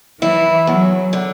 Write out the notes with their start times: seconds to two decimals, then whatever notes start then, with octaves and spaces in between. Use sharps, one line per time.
0.21 E3 E4
0.67 E2 F#3
1.13 D3